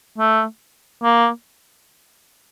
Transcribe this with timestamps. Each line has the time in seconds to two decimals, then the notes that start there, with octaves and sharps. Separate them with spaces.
0.18 A3
1.03 A#3